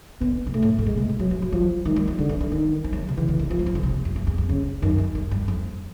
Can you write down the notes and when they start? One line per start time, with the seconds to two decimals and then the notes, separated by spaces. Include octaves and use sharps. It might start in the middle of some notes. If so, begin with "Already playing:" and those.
0.20 D3 B3
0.47 B2
0.54 A#2 A3
0.62 A2
0.79 A2
0.86 A#2 G#3
0.97 C3
1.09 B2
1.19 E3 F#3
1.31 E3
1.42 F3
1.52 F3 F#3
1.85 D#3 G3
1.96 G3
2.07 F#3
2.19 D3 F3
2.29 E3
2.40 D#3
2.52 D#3 E3
2.84 F3
2.93 F#3
3.09 C3
3.17 C#3 E3
3.28 D3
3.39 D#3
3.50 E3 F3
3.59 F#3
3.66 F3
3.75 D3
3.83 C3
4.05 F2
4.16 E2
4.27 E2
4.38 F2
4.49 F2 C#3
4.82 F#2 D#3
4.98 F2
5.15 F#2
5.31 G2
5.48 F2